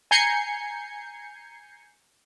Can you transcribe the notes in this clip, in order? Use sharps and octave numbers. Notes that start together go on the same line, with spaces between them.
G#5 A#5 G6 G#6 C7 C#7